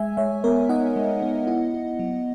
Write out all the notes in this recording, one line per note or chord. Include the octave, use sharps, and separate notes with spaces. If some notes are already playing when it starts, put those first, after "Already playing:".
Already playing: G#3 E5 G#5
G#3 C#5 E5
B3 A#4 C#5
D#4 D#5 F#5
G#3
B3
E4
E4
F#3